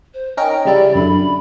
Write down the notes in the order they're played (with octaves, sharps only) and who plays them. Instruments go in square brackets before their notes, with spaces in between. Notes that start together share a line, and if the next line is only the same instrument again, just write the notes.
[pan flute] C5
[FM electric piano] C#4 D#4 A#4 [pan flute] G5
[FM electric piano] C#3 G3 E4 [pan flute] D5
[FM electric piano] F#2 D3 [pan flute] B5